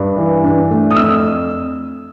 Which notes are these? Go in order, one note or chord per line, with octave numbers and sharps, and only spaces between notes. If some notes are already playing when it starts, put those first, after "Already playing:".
Already playing: G2
E3
D4
A3
D#6
F2 E6